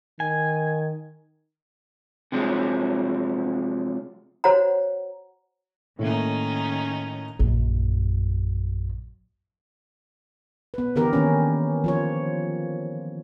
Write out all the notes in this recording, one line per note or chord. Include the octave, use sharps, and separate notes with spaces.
D#3 G#5
C3 F3 F#3 G#3
F#4 C5 C#5 F#5 A#5
A2 D#3 A3 A#3 C#4 D#4
A#1 F#2
B3 B4
D3 E3 B3 G4 A#4
D#3 A#3 C#4
F3 F4 C#5